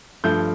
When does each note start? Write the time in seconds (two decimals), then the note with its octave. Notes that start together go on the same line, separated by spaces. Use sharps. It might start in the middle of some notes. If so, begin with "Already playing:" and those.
0.24 G2 F3 A3 G6